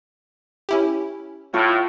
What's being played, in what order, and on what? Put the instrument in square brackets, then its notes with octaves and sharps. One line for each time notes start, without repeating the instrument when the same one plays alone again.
[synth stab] C#4 E4 G4
[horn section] A2 [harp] F4 C#6